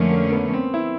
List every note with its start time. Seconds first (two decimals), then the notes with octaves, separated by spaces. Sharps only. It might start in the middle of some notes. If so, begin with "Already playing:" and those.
Already playing: F2 D3 F3 A3 A#3 C#4
0.11 A#3
0.32 B3
0.53 C4
0.74 E4